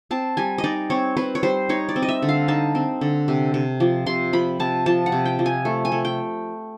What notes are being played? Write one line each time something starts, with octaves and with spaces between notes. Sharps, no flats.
C4 A5
G3 G#5
D#5
D#4 D5
C4 C#5
C4 B4
C#5
G3 C5
D#4 C#5
D5
C4
D#5
E5
D3
F5
D#4 A5
C4
D3
C3
C3
F3
C3 C6
F3 B5
C3 A5
F3 A5
F#5
C3
G5
F3
G#5
A3
G#5
A3
G5